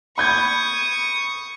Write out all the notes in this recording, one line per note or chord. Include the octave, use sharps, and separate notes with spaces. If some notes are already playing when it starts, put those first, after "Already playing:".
B5 C#6 D#6 G6 G#6